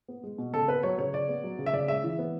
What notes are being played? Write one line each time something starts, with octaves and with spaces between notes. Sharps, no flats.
B3
G#3
B2
C#3 A4
B3 B4
F#3 C#5
C#3 C#5
C#3 D5
B3
F#3
C#3
E5
C#3 D5
G#3 E5
E3
B3